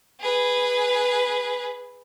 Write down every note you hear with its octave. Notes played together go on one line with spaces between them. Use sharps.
G#4 B4